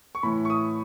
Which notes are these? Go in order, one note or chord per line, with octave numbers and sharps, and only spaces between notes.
C#6
A2 E3 B5
C#6
D#6